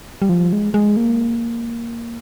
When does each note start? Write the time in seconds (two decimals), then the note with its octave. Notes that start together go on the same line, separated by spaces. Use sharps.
0.22 G3
0.29 F3
0.52 G#3
0.74 G#3
0.97 A#3